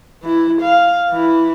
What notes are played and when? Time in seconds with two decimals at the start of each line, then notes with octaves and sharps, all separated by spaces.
0.23 E3 E4
0.61 F5
1.11 E3 E4